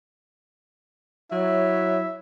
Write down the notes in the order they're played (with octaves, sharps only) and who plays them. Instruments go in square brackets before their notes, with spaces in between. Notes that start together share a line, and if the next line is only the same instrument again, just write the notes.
[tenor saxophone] F#3 [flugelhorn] E4 [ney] C#5 [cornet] E5